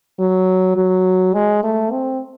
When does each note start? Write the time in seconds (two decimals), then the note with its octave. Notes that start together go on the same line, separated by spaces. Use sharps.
0.19 F#3
0.77 F#3
1.34 G#3
1.64 A3
1.92 C4